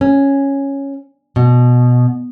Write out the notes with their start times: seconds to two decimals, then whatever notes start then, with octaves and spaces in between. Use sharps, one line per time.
0.01 C#4
1.36 B2